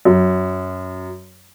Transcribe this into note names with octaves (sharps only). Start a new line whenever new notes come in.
F#2